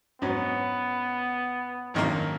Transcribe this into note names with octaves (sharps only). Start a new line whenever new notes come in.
G#2 F#3 B3 C#4
G#1 F#2 D#3 A#3